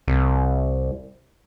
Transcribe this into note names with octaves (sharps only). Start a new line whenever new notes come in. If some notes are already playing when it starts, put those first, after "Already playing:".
C2